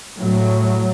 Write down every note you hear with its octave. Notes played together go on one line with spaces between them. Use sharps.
A2 F#3